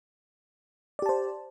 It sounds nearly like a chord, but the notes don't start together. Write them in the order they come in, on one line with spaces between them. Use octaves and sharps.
D5 G4 A5 C5